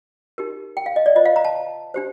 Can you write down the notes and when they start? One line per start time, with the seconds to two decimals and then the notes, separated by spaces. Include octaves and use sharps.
0.38 D#4 G4 A#4
0.77 G5
0.86 F5
0.96 D#5
1.06 D5
1.16 F4 C5 D#5
1.26 F5
1.36 A#5
1.45 A5
1.94 D4 G4 C5